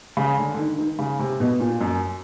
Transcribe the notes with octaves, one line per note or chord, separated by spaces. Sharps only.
C#3
D3
D3
D#3
D#3
C#3
C3
B2
A#2
F#2